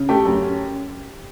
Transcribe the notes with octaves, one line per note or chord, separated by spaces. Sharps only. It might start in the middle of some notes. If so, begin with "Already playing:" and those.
Already playing: C#3
A3 G4 G5
F#2
C#4